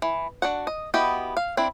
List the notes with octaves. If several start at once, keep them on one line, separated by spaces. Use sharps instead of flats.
E3
D4 F#4 F#5
D#5
B3 E4 F#4 G4 D#5
F5
C4 D4 E4